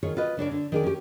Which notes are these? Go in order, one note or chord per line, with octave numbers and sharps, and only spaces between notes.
D#3 F4 G#4 C#5
F4 B4 D#5
C#3 D4 C#5 D5
D3
D#3 G#4 D5
C#4 G4